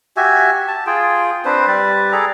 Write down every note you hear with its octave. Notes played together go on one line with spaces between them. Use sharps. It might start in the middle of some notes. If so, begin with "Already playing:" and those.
F#4 G4 E5 G#5
A5
F4 G#4 G5
C4 D4 B4 C5
G3 G4 B4 D5
G#4 A4 D5 A#5